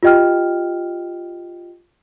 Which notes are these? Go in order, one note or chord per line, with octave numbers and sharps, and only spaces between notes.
F4 G4 D#5 G5 F6